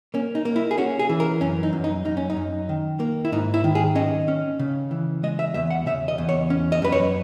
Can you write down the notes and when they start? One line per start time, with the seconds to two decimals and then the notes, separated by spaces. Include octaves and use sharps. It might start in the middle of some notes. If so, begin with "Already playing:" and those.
0.14 A#3 C#4
0.35 D#4
0.45 A#3
0.56 E4
0.71 G#4
0.78 C#4 F#4
0.99 G#4
1.09 E3
1.20 A#4
1.41 F#2 C#4
1.63 D#4
1.73 F#2
1.84 D#4
2.05 F#2 D#4
2.17 C#4
2.30 D#4
2.37 F#2
2.69 D#3
3.00 A#3
3.25 E4
3.32 G#2 D#4
3.54 E4
3.64 D#3
3.75 G#4
3.95 C#4 D#5
4.28 C#4
4.59 C#3
4.91 E3
5.23 G#3 D#5
5.39 E5
5.54 E2 E5
5.70 F#5
5.86 C#3 E5
6.08 D#5
6.18 E2
6.29 C#5
6.50 C#4
6.72 D#5
6.82 F#2 B4
6.92 C#5